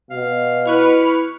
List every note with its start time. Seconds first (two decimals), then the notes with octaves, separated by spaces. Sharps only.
0.11 B2 F5
0.66 E4 B4 C#6 F6